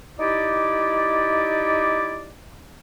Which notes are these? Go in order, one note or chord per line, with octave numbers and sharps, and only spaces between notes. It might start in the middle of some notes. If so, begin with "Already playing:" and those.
D#4 E4 G4 D5